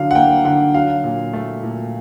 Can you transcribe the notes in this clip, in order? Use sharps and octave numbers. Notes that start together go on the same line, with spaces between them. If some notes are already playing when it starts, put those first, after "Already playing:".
Already playing: D3 F#3 F5
F#5
A#3 G5
D3 F#5
F#3 F5
A#2
A3
A#2